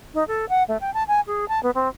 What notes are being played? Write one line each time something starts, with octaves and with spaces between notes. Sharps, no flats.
D#4
A4
F#5
A3
G5
A5
G#5
G#4
A5
B3
C4